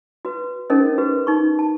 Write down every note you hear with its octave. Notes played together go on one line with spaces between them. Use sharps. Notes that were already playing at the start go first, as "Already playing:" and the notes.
F#4 B4
C#4 D#4 G#4 A#4 C5 D#5
F#4 G4 B4
D#4 C#6
A5